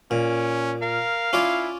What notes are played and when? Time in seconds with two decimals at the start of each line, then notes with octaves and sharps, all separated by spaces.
0.11 A#2 C#4
0.82 A#4 F5
1.33 C#4 E4 F4 D5